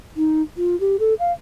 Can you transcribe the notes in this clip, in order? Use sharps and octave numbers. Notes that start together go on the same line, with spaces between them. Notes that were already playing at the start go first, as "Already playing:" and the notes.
D#4
F4
G4
A4
F5